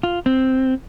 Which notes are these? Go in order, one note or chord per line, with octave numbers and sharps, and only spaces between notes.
F4
C4